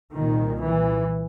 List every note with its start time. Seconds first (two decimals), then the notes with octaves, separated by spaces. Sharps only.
0.16 C2 A#2 D#3
0.63 E3